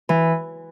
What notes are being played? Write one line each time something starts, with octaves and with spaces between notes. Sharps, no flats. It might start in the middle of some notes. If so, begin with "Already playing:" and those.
E3